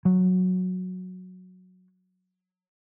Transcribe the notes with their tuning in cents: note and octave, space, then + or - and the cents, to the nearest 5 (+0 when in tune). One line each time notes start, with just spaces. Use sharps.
F#3 -10